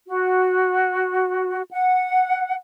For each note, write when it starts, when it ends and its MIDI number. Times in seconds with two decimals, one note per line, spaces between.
0.08 1.62 66
1.72 2.55 78